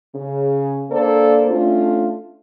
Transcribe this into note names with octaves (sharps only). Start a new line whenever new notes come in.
C#3
D3 A#3 A4 C5 D5
A3 C#4 D4 F4